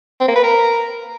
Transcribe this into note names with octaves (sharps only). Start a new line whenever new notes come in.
C4
A#3
B4
A#4